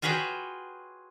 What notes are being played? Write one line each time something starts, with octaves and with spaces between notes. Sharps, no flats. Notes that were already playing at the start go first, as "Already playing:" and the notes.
F4 F#4 G#4 B4 C#5 G5